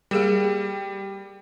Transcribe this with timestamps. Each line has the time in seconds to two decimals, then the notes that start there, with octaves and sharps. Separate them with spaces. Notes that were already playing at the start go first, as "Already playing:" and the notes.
0.11 G3 A#3 G#4 A#4